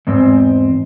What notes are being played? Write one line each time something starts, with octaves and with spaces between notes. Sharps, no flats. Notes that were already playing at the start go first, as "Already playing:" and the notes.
E2 G#2 C4